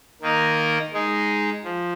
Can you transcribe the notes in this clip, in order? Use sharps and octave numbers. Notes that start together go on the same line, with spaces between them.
D#3 A#3 D#4 A#4 D#5
G#3 D#4 G#4
F3